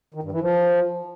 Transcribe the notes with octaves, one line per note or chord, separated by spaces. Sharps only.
D#3
G2
E3
F3